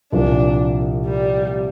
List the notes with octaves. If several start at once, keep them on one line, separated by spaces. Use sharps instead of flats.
C2 A#2 F3 D4
G3